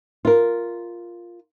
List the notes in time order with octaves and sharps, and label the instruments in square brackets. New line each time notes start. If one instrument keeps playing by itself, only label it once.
[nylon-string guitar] F4 A#4